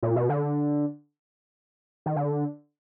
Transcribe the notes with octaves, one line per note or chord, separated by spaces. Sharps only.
A#2
B2
D3
D#3
D3